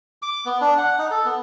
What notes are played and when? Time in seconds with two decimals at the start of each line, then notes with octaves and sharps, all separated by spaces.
0.22 D6
0.46 B3
0.61 D4
0.78 F#5
0.98 D#4
1.11 A4
1.25 B3